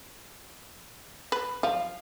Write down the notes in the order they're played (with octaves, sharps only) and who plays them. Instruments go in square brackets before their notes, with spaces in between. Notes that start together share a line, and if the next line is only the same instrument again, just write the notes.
[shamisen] B4
[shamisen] F3 [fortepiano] F5